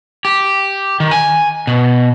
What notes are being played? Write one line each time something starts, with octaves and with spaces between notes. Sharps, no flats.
G4
D#3
G#5
B2